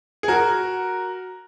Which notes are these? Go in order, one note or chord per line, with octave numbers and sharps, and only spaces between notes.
G#4
F#4 A#4